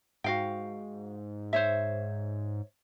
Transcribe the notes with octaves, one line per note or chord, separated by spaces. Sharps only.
G#2 F#4 F5 G5
C5 C#5 E5